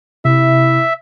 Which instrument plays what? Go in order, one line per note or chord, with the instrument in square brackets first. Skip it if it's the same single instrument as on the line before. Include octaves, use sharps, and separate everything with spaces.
[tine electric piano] C3 [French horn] E4 [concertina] E5